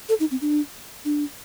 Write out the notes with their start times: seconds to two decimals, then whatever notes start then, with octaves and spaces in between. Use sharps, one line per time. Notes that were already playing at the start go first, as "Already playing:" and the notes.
0.09 A4
0.20 D#4
0.31 C4
0.41 D4
1.05 D4